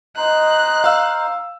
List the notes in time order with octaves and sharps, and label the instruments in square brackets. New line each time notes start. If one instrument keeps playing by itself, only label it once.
[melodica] D#4 C5 [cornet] D#5 [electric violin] F#6
[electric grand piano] F5 E6